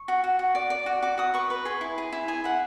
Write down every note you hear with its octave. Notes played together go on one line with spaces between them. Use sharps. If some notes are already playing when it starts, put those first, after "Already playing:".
Already playing: C#6
F#4
F#4
F#4
D5
D5
F#4
F#4 D6
F#4 D#6
B4 C#6
B4
G#4 C6
E4
G#4
E4
G#4 G#5
E4 F#5